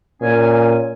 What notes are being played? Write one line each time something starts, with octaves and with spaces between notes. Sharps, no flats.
A#2 C#4 G#5